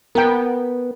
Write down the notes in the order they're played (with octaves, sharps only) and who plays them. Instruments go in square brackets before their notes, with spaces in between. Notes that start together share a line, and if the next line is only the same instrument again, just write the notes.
[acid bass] B3 [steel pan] A#4 G5